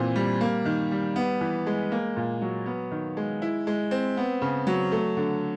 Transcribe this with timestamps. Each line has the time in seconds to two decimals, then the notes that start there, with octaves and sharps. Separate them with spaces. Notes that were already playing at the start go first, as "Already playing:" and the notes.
Already playing: A#2 E3 C4
0.16 G3
0.41 A#3
0.65 D#3
0.92 G3
1.16 B3
1.41 E3
1.66 G#3
1.92 A#3
2.16 A#2
2.42 F#3
2.66 B3
2.91 D#3
3.17 G#3
3.42 E4
3.67 G#3
3.91 C4
4.17 B3
4.42 C#3
4.67 F#3
4.92 A3
5.17 D3